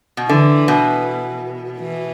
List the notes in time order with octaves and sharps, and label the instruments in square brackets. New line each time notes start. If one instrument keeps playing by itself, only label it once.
[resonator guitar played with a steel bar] B2
[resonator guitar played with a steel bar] D3 [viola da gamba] E3
[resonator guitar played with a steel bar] B2
[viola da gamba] E3